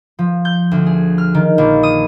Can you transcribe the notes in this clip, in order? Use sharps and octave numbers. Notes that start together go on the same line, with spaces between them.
F3
G6
D2
G#4
F6
D#3
A#1
D#6